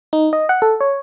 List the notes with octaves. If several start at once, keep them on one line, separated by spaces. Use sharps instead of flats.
D#4
D#5
F#5
A4
C#5